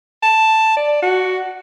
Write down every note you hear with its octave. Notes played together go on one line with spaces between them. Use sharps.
A5
D5
F#4